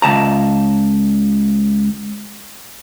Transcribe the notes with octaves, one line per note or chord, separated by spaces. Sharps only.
C#2 A5 A#5